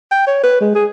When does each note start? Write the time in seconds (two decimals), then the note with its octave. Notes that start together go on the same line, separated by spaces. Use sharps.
0.11 G5
0.27 C#5
0.43 B4
0.60 G#3
0.75 G#4